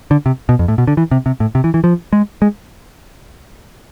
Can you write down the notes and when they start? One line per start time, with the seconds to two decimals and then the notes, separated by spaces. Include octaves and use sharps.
0.11 D3
0.26 C3
0.49 B2
0.59 F2
0.68 A2
0.78 B2
0.87 D3
0.97 E3
1.11 C3
1.26 C3
1.40 A2
1.55 C3
1.64 E3
1.74 E3
1.84 F3
2.13 G#3
2.42 G#3